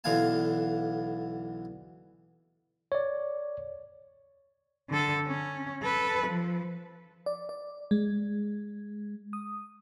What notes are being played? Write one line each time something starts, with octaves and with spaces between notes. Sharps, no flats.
B1 D3 E3 F5 G#5 A5
C#5 D5
D3 A4
C#4
A4 B4
F3
D5
D5
G#3
D#6